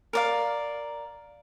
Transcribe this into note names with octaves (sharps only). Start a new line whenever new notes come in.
A#4 D5 F5